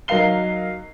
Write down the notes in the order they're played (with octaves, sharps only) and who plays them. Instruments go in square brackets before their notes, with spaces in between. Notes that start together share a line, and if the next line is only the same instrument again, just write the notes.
[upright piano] F#3 D#4 A#4 F5 C7 G7